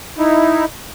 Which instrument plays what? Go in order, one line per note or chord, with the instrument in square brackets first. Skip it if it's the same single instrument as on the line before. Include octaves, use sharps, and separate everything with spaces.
[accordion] D#4 E4